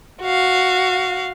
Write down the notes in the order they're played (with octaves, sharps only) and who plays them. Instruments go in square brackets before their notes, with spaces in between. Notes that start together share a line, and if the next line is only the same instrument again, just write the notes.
[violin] F#4 F5